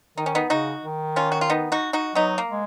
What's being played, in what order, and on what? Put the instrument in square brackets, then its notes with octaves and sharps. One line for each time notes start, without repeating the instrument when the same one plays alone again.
[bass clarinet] D#3 [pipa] D#4
[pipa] C#4
B3 D#4
[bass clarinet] C#3 [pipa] D#4 F#4
[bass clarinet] D#3
[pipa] C#4 F4
F#4
F4
B3 D#4
D#4 F#4
D#4 F#4
[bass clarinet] F#3 [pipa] B3 D#4
[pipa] A#3
[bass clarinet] G#3